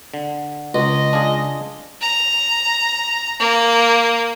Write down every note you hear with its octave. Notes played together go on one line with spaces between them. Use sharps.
D3
C#2 D#5
D4 F4 G#4
A#5
A#3